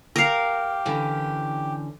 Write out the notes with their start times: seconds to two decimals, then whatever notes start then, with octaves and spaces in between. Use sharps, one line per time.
0.16 G4 A#4 F5
0.85 D3 E3 C#4